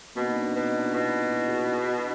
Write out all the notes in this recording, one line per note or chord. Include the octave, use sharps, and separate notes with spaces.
B2 A#3 C4
D#4
C4 D4
B2 C#4 D#4
D4 E4
B2 D#4 F4
E4 F#4
F#4 G#4
F#4 G#4
D4 E4